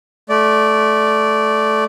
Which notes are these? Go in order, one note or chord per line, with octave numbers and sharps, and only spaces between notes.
A3 D5